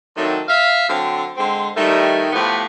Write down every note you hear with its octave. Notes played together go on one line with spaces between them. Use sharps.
D#3 F#3 A3 C4 D4
E5 F5
D3 F#3 C4
D3 G#3 C4 C6
D#3 G3 A3 D#4 E4
A2 F3 B3 G4 B4